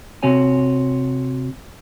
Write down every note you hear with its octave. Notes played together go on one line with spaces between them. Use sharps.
C3 C4 F#4 C#5 G#5